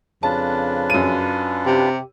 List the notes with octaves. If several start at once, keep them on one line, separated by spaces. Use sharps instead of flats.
F2 C#3 D4 F4 B4 A5
F#2 D#7
C3 G4